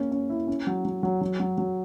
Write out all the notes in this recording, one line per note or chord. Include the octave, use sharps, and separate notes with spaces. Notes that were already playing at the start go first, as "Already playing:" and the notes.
Already playing: A#3 C#4
C#4
E4
C#4
F#3
F#3
F#3
F#3
F#3
F#3